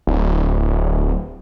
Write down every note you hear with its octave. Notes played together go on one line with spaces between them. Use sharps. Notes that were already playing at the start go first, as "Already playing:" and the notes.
D1